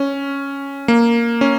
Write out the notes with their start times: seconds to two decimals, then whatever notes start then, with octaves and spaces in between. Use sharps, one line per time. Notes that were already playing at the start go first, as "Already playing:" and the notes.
Already playing: C#4
0.88 A#3
1.41 C#4